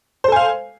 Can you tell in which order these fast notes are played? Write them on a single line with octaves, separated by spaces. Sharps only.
C5 A4 G#5 F5